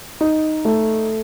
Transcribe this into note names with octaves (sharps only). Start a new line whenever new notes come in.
D#4
A3